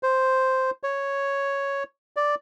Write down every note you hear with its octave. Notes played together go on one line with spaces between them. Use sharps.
C5
C#5
D5